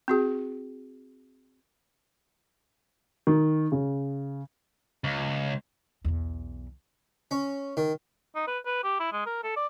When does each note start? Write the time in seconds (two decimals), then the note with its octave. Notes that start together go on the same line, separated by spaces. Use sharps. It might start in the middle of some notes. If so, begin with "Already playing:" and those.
0.08 C4 F#4 G#4
3.27 D#3
3.72 C#3
5.04 C#2
6.05 B1 E2
7.31 C#4
7.77 D#3
8.36 D#4
8.47 B4
8.66 B4
8.84 G4
9.00 E4
9.13 G#3
9.26 A#4
9.44 A4
9.56 D5